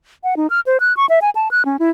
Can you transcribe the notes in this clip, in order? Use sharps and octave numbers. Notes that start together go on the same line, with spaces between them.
F#5
D#4
F6
C5
F#6
C#6
E5
G#5
A5
F#6
C#4
E4